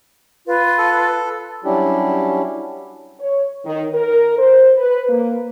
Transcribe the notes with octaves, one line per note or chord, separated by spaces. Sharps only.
F4 B4
A4
F#3 G3 C#4 D4 E4 G4
C#5
D#3
A#4
C5
B4
A#3